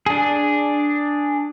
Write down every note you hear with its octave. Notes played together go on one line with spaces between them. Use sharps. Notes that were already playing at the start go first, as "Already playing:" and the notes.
D4 G#4